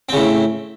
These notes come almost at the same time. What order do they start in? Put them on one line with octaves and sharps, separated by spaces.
C4 C#3 A2